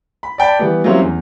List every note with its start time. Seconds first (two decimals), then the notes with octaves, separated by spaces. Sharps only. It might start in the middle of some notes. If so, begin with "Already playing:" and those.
0.23 B5
0.38 D5 G5 A5 B5
0.59 E3 G3 B3
0.84 F#3 G3 A#3 C4 C#4 E4
1.01 E2